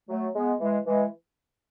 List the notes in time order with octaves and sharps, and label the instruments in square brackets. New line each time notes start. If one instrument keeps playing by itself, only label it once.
[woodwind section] F#3 A3
G#3 B3
E3 G#3
E3 G#3